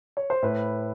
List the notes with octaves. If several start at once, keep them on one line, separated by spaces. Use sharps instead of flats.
C#5
C5
A2 B4